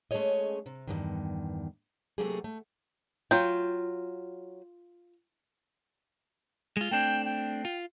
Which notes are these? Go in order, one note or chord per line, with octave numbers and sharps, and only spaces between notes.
G#3 A3 C#4 G#4 C#5 D#5
C3
E2 G2 D#3
C3 F#3 A3 A#3 G4 G#4
A3
F#3 F4 G5
G#3 F4
A3 C4 D4 G5
G5
F4